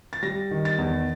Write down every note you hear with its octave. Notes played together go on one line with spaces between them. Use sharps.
A6
G3 A#6
D#3
A6
E2